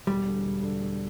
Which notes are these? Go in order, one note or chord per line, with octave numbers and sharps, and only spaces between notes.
E1 G3
D3
E1
D3
E1